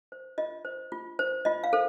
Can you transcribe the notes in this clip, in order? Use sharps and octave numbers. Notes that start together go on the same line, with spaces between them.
C5
F4 D#5
C5
F4
C5
F4 D#5
F5
A4 C5